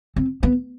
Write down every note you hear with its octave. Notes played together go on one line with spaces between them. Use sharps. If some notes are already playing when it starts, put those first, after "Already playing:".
C4
B3